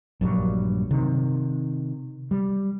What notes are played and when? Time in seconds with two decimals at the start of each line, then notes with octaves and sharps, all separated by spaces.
0.21 A#1 G2 F#3 G3
0.91 C3 D#3
2.31 G3